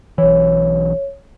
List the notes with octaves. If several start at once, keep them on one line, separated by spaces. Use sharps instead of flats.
B1 E3 C#5